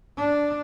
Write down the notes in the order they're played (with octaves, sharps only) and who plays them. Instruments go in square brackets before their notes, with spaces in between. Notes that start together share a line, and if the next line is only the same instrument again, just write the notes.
[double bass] D4